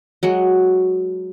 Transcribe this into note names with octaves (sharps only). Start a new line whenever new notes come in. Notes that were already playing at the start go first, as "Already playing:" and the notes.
F#3 G#3 F#4